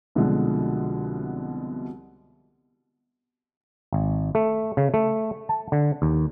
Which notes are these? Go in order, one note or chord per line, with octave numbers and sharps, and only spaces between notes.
C2 B2 D3 F3 G#3
G#1
A3
C#3
A3
A5
D3
D#2